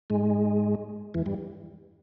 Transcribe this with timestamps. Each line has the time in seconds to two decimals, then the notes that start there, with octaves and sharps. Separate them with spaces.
0.10 G#2 G#3
1.14 E2 E3
1.26 G2 G3